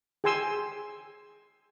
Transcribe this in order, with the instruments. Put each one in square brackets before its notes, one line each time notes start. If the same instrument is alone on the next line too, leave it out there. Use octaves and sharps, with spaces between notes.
[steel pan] G#4 G5 G#5 C6 E6